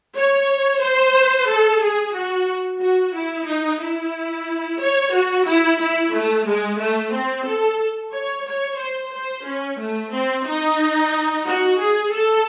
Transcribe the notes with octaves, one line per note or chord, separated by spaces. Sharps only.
C#5
C5
A4
G#4
F#4
F#4
E4
D#4
E4
C#5
F#4
E4
E4
A3
G#3
A3
C4
A4
C#5
C#5
C5
C5
C#4
A3
C4
D#4
F#4
G#4
A4